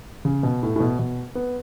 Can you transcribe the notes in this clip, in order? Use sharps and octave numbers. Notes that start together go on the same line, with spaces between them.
C#3
B2
A2
A2
B2
B2
B3